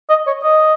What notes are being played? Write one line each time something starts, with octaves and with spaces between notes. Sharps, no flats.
D#5
C#5
D#5